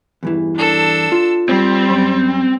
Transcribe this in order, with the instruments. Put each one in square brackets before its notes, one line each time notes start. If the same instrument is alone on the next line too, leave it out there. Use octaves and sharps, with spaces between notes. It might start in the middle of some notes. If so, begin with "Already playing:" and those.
[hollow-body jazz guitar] E2 G2 E3
[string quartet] D4 A4 E6
[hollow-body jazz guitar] F4
[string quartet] G3 [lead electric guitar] C4
[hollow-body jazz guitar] F#2 B5